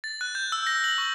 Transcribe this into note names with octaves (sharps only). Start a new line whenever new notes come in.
A6
F#6
G6
E6
A#6
F#7
C#6